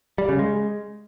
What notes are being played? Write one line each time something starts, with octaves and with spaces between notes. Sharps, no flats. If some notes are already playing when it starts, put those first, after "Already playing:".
G3
C#3
G#3